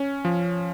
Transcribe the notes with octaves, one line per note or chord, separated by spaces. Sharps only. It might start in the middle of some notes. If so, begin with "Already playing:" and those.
Already playing: C#4
F3